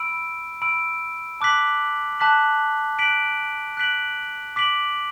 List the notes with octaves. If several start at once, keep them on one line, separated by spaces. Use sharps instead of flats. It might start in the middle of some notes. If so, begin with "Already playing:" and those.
Already playing: B5 E6 D7
B5 E6 D7
A5 D6 F#6 B6 F#7
A5 D6 F#6 B6 F#7
F#6 B6 D7 F#7
F#6 B6 D7 F#7
D6 B6 D7 F#7